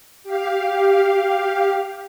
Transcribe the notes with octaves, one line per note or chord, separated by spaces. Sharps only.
G4 F5